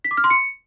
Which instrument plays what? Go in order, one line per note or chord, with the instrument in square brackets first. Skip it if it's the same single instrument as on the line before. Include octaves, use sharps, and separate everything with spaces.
[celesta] B6
D6
F6
C6
C#7